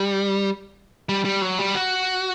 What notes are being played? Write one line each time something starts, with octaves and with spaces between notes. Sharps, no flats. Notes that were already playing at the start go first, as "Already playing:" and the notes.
Already playing: G3
G3
G3
F#3
G3
F#4